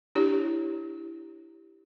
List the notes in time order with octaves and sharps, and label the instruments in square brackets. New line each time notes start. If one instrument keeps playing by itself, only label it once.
[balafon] D4 E4 G4 C#5